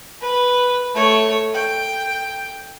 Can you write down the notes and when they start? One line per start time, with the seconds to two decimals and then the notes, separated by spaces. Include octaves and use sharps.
0.21 B4
0.94 A3 C#5
1.54 G5